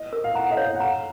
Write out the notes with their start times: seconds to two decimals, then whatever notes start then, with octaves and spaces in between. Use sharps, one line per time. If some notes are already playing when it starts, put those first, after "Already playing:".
Already playing: D#5
0.13 A#4
0.24 F5
0.35 F#5 A#5
0.51 D#5
0.57 C#5 F5
0.75 F#5
0.80 F5 A#5